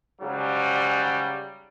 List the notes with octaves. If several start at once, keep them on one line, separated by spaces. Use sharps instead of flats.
G#2 C#3 F#3 G3